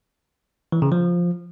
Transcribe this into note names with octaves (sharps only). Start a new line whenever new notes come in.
E3
C#3
F3